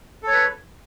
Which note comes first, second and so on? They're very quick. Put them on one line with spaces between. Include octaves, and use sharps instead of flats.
A4 C#5 B4